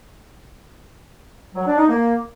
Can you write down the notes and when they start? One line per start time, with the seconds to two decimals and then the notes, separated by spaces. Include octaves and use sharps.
1.55 F#3
1.66 D4
1.77 D#4
1.88 A#3